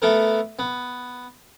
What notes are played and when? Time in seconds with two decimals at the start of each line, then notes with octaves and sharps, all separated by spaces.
0.02 A3 B3 A4 A#4
0.59 B3